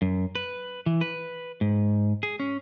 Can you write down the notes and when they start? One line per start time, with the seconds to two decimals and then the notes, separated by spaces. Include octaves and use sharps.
0.02 F#2
0.35 B4
0.86 E3
1.01 B4
1.61 G#2
2.23 G#4
2.40 C#4